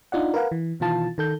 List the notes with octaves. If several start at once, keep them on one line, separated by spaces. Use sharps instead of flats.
D4 D#4 F4 D5 F#5
A#4 B4 F5 F#5
E3
B2 D#3 E3 F4 A5
D#3 A4 G6